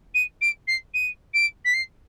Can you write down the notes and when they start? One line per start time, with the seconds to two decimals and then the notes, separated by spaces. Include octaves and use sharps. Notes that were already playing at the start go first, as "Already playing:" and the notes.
0.14 D#7
0.41 D7
0.67 C7
0.94 D#7
1.34 D7
1.64 B6
1.73 C7